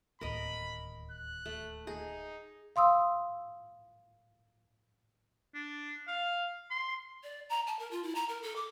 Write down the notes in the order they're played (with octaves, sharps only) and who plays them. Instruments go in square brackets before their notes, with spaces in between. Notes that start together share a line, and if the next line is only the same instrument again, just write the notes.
[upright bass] D1 D#2 [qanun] A#4 D#5 [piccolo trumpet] B5
[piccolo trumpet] F#6
[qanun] A3
[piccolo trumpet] D#4 [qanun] G#4
[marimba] F5 C6 D#6 E6
[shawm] D4
F5
C6
[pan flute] D5
A#5
A5
A#4
F4
E4
A#5
A#4
A4
D6